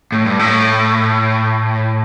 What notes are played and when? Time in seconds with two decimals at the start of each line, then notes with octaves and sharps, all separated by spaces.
0.12 A2
0.26 G2
0.39 A2